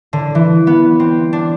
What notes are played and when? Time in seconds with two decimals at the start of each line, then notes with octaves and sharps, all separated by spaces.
0.13 D3
0.35 E3
0.67 B3
1.00 C4
1.33 D4